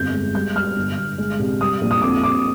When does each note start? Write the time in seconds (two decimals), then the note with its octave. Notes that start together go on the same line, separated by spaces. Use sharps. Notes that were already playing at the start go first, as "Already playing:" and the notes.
Already playing: G1 F2 G6
0.14 G#3
0.35 G3 G6
0.55 G3 F6
0.77 G1
0.98 G1
1.18 G#3
1.39 C2
1.60 G3 D#6
1.81 A#1
1.91 D#6
2.02 F2 D6
2.23 F2 D6